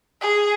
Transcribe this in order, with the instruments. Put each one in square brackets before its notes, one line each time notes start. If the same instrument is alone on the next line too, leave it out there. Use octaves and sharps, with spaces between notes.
[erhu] G#4